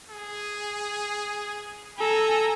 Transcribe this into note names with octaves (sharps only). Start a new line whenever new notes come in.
G#4
A4 G#5 A#5